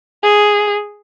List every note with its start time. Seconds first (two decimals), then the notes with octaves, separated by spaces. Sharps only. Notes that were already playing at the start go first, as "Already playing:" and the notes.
0.23 G#4